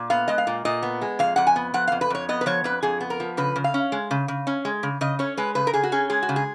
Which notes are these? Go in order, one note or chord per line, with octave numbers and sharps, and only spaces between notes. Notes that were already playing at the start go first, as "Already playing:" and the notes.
Already playing: A#2
B3 F5
G#3 D#5
F5
A#2
A#2 D#5
B3
G#3
F2 F5
F2 F#5
G#5
B3
F3 F#5
F2 F5
B4
F2 C#5
B3 D#5
B4
F3 C#5
F2 B4
F2 G#4
B3
A#4
F3
C#3 B4
C#3
F5
C#4
G#3
C#3
C#3
C#4
G#3
C#3
C#3 D#5
C#4 C#5
G#3 B4
C#3 B4
A#4
C#3 G#4
F#4
C#4 G#4
G#3 G#4
F#4
C#3
G#4